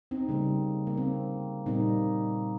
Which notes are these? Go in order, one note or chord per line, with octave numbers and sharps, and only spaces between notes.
C4 D#4
C#3 G3 A#3
A#3
C4
A#2 G3 A#3 C4 D#4